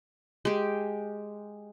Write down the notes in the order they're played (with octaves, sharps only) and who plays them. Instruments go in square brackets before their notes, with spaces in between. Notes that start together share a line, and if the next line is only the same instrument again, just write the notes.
[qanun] G#3 G4